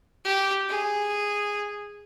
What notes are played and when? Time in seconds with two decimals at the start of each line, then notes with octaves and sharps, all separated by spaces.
0.25 G4
0.69 G#4